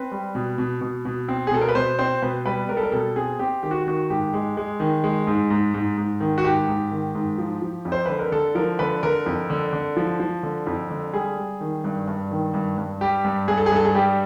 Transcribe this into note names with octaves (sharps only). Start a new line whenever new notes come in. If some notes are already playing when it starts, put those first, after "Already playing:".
Already playing: C4 B4
G3
B2
B2
B2
B2
C4
G#4
B2 A4
A#4
B4
B2 C5
C4 C5
B2 B4
G3 B4
G3 A#4
A4
A#4
B2 A4
C4 G#4
C4 G4
D#3 G4
F#4
D#3 F#4
G#2 G4
G#3
G#3
D#3
G#3
G#2
G#2
G#2
G#2
D#3
F#4
G#2 G4
G#2
D#3
G#2
F3
F3
F2
C5
D3 B4
A#4
D3 A4
F3 A#4
D3 B4
D3 A#4
F2
D3
D3
F3
F3
D3
F2
D3
G3 G#4
G3
D#3
G2
G2
D#3
G2
G2
G3 G4
G2
G2 G#4
A4
G#4
G2 A4
G#4
G3 G4